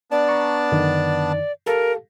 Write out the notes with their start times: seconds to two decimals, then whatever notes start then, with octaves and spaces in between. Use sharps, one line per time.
0.11 B3 D4 D5 A5
0.29 A#5 C#6
0.72 F#2 D3 D#3
1.66 G4 A4 A#4 F5